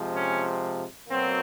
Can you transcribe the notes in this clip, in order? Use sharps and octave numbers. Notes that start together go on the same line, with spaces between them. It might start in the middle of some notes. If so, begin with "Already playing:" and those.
Already playing: C3 F3 G#3
C#4
B2 F#3 A#3 C4